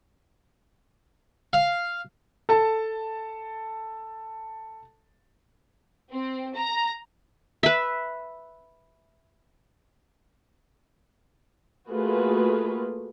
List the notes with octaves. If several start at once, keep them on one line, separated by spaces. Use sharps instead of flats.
F5
A4 A5
C4
A#5
B4 E5
A3 A#3 F4 F#4 G#4 B4